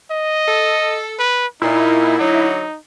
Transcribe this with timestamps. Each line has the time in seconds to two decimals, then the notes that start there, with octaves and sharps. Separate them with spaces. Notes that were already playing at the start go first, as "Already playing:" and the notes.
0.11 D#5
0.47 A4
1.19 B4
1.62 A#2 D#4 E4
2.18 D3 F#3 D#4